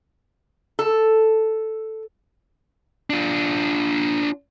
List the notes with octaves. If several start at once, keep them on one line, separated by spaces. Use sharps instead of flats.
A4
D4 F4